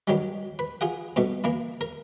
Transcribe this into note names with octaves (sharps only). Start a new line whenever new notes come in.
G2 D#3 F#3 G3
B4
F4 G#4 F#5
G2 B2 A3
E3 A#3 E4
A#4